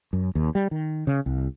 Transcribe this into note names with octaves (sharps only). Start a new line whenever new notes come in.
F#2
D#2
G3
D#3
C#3
C2